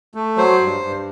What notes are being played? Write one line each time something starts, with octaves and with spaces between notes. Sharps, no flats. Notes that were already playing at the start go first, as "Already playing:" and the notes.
A3
F#3 C5
G2
G2